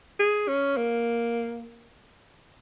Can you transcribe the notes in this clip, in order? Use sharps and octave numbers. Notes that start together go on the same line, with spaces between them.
G#4
C#4
A#3